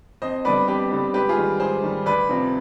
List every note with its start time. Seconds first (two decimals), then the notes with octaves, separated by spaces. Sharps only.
0.22 F2 C5 D#5
0.45 D3 G3 B3 B4 D5
0.68 F2 G4 B4
0.91 D3 G3 B3
1.14 G#2 G4 B4
1.29 F4 G#4
1.37 D#3 G3
1.60 G#2 G#4 C5
1.83 D#3 G3
2.06 D2 B4 D5
2.29 C3 F3